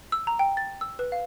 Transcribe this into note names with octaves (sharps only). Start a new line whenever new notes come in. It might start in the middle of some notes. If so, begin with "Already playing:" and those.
E6
A#5
G5
A6
E6
B4
F5